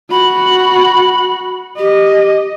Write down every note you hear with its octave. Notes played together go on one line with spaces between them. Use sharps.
F#4 B5
G4 D#5